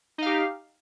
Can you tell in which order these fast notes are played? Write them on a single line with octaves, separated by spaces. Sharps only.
D#4 F5 G4